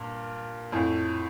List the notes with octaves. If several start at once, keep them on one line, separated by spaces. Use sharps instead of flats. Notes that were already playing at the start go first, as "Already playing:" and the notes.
Already playing: G2 A#2
F2 A2